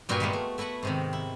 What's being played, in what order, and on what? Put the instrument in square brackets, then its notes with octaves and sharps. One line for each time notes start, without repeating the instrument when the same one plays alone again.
[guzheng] G2 A#2 F#4 B4 G5 G#5
G3 G#3 A#3 B3 F4 F#4
A3
A3 E4 F#4 B4 F#5
G#2 C3 D#3
E4